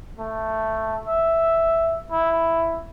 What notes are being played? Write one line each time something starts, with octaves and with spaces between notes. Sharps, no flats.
A3
E5
E4